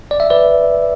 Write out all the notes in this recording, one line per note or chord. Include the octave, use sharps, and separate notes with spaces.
D5
E5
B4 D5